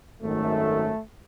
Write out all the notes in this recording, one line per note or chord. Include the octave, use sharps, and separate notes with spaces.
G#1 F#2 D#3 A3